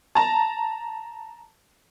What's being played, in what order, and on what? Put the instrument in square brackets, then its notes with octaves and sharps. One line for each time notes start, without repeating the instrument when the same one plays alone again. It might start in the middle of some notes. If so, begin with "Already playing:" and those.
[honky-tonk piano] A5 A#5